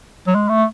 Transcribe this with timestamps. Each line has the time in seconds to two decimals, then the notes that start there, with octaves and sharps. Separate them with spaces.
0.27 F#3
0.35 G#3
0.49 A3